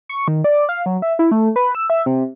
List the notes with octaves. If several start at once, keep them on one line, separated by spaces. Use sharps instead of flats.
C#6
D#3
D5
F5
F#3
E5
E4
A3
B4
E6
E5
C3